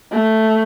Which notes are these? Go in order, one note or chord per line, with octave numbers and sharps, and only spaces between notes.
A3